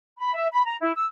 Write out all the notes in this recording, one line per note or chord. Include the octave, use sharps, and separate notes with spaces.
B5
E5
B5
A#5
E4
E6